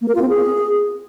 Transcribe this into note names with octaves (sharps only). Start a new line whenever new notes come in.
A#3
A#4
F4
C4
G#4